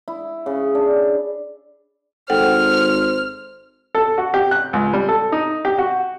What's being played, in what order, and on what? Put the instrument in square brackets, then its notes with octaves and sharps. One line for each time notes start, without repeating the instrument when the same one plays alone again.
[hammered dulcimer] E4
C#3
D4
[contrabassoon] G#1 [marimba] A4 F#5 G5 [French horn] C5 [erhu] F6
[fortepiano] A4
F#4
G4
F#6
C#2
G3
A4
D#4
G4
F#4